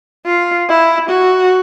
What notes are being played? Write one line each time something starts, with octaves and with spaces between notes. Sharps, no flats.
F4
E4
F#4